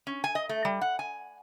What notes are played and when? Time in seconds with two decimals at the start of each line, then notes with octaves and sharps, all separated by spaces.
0.07 C#4
0.24 G#5
0.35 D#5
0.49 A3
0.65 G3
0.81 F#5
0.99 G#5